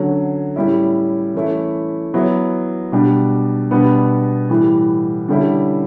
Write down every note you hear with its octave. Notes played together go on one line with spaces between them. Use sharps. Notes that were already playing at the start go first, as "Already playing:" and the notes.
Already playing: D3 F#3 C#4
A2 G3 C#4 E4
E3 A3 C#4 E4
F#3 B3 E4
B2 G3 D4
B2 G3 B3 D4
A2 E3 G3
D3 G3 C#4 E4